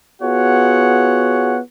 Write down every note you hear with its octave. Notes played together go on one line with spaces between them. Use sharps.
B3 F4 F#4 G#4 C#5 F#5